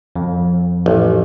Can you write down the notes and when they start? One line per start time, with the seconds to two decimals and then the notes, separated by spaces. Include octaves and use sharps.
0.16 F2
0.86 A1